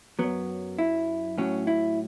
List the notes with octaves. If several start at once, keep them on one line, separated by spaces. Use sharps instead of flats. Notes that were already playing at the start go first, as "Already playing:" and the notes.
F#2 F#3 B3
E4
A2 F#3 C#4
E4